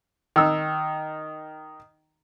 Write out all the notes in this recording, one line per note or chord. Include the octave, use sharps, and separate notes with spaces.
D#3 E6